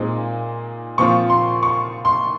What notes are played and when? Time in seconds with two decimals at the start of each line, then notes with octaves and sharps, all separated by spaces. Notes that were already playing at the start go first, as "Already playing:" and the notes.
Already playing: A#2 G#3 C4 D#4
0.98 A#2 F3 C4 F4 C#6
1.30 C6
1.63 C#6
2.05 C6